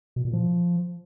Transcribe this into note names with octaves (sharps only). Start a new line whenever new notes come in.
B2
A#2
F3